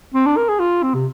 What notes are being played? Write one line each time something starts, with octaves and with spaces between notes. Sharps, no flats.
C4
D4
A#4
G#4
F4
C4
C3